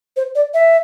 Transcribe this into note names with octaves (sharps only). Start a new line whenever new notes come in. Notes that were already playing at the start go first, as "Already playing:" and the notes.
C5
D5
E5